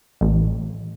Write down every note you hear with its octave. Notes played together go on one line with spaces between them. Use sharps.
A1